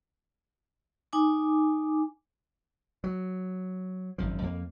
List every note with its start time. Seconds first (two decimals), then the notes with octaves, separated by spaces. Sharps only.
1.13 D#4 G#5 D6
3.04 F#3
4.18 G#1 F#2 F3
4.42 F2 A#3